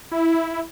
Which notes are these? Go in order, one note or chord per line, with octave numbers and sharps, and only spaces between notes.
E4